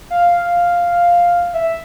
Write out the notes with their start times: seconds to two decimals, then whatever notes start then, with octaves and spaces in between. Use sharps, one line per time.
0.10 F5
1.54 E5